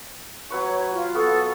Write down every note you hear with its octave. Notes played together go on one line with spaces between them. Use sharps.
F#3 B4 C#5 C#6
F4
B3 A4 C#6